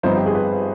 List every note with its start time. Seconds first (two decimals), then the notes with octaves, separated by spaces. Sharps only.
0.03 G1 G2 F3 C4 D#4 C5
0.17 G4
0.26 G#4
0.35 B4